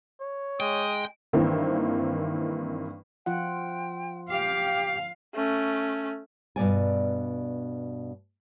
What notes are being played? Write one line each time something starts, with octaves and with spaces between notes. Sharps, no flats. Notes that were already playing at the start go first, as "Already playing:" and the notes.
C#5
G#3 G5 D#6
G2 D#3 E3 A#3 C4 E4
F3 F4 F#5 G5
G4 F5 G5 D6
A3 C#4
G2 B2 D5 G#5